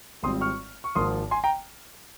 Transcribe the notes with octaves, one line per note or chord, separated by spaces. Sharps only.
G#1 G#2 G3 C4 F4 C6 D#6
C#6 F6
C#6
G#1 G#2 F3 A#3 F4 C6 D#6
G#5 C6
G5 A#5